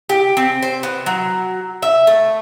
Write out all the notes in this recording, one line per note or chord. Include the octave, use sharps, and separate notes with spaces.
G4
C4
C5
B3
F#3
E5
A3